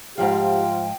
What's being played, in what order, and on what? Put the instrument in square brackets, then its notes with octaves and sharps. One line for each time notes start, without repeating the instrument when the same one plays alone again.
[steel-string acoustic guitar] G#2 F3 F5 [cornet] F4 [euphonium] G4 [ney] G5